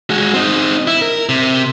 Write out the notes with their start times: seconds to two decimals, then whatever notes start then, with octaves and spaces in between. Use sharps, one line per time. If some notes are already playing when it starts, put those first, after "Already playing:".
0.10 G#3 F#4
0.34 C4 D#4
0.87 E4
1.01 A#4
1.29 C3